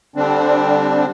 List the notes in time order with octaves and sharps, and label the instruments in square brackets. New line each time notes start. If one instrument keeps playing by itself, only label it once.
[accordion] D3 G3 C4 D4